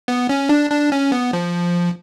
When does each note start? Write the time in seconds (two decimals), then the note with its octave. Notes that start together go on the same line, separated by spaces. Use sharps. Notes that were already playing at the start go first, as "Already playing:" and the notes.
0.08 B3
0.29 C#4
0.49 D4
0.71 D4
0.92 C#4
1.12 B3
1.33 F3